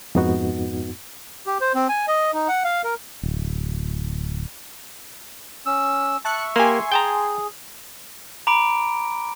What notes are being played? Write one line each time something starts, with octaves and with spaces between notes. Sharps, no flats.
F2 G#2 B3 D#4 F#4
G4
C5
C4
G#5
D#5
D#4
F#5
F5
A#4
D1
C#4 E6
E5 A5 C#6 F#6 C#7
A#3 G4 G#5 C6
G#4 G5 A5 A#5
A#5 B5 D6 D7